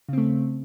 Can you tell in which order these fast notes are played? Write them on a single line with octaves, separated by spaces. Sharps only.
C#3 C4 A3